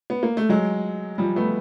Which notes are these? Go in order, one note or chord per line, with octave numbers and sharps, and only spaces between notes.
B3
A#3
A3
F#3 G#3
F3 G3
A3 B3